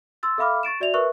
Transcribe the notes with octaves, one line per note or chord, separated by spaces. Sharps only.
C6 E6 A6
A4 E5 F5 B5 D6 F6
C#6 A6 D7 E7
F#4 D5 E5 F7
A#4 B4 E5 C#6 F#6